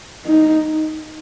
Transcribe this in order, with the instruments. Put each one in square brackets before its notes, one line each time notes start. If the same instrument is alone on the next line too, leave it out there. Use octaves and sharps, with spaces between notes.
[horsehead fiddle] D#4